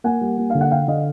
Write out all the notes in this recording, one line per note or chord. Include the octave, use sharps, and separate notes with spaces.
A#3 F#5 G#5
G3
A#3
D3 F5
F#5
D3 F5 G5
D3 D#5 F5